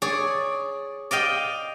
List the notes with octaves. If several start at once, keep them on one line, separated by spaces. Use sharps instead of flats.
G#4 C#5 D5
D5 D#5 F5 G5